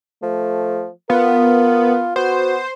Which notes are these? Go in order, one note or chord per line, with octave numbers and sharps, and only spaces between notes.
F3 A3
B3 F4 A#4
B3 F#4 C5